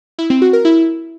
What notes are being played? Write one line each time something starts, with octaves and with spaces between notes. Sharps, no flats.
E4
C4
F#4
A#4
E4